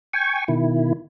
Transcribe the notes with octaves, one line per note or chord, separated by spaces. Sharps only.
G5 G#5 C#6
B2 D#3 E4